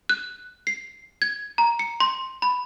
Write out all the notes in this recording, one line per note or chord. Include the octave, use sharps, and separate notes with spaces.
F#6
C7
G#6
A#5
C#7
C6
B5